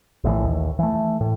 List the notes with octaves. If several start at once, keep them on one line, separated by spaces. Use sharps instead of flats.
A#1 A2 D#3 E3
D#2
E3 A3
A2